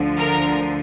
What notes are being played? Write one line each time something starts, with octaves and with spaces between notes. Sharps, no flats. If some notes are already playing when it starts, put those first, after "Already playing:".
Already playing: D2 D3 F3
A#4